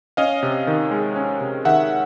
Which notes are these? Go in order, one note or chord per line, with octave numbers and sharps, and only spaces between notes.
C#4 D#5 F5
C3
D#3
G#3
C#4
C3
D#3 E5 F#5